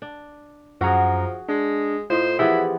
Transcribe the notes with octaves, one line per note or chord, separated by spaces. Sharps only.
D4
F#2 F3 F#4 G#4 F#5 A#5
G#3 D4
A2 D#4 F4 C5
E3 F3 B3 E4 G4 G#4